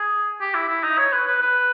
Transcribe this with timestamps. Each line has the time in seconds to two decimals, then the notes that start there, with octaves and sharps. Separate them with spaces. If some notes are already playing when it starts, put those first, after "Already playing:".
Already playing: G#4
0.41 G4
0.55 E4
0.69 E4
0.84 D#4
0.98 C#5
1.12 B4
1.28 B4
1.42 B4